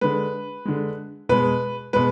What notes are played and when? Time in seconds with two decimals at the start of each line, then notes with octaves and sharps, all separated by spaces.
0.01 D3 G#3 B4
0.65 D3 G#3
1.29 B2 G#3 B4
1.93 B2 G#3 B4